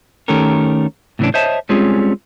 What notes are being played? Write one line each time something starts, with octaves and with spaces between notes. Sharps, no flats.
D#3 A3 C#4 G4 A4 A#4
A2 C#3 E3 G#3 C#4 D4
C5 C#5 D#5 E5 A5
G3 G#3 C4 C#4 F4 G#4